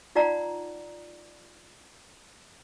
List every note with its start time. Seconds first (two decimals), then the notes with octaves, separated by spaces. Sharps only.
0.15 D#4 F4 D5 F#5 A#5